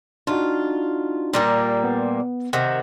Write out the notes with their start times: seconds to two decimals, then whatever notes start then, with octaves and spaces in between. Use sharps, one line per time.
0.27 D4 D#4 F4 F#4
1.33 A#2 G3 A#3
1.84 B3
2.53 C3 D#3 F#5